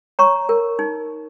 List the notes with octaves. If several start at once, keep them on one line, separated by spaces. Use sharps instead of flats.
C#5 A#5 C#6
A#4
D#4